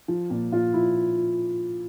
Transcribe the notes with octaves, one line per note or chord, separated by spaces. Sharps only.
F3
A#2
A#2 F4
F3 E4